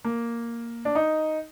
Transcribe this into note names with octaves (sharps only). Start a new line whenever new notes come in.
A#3
D4
D#4